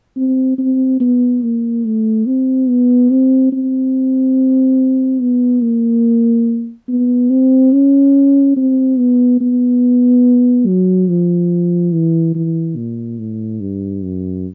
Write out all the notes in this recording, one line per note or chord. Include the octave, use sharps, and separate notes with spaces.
C4
C4
B3
A#3
A3
C4
B3
C4
C4
B3
A#3
B3
C4
C#4
C4
B3
B3
F#3
F3
E3
E3
A#2
A2
G2
F#2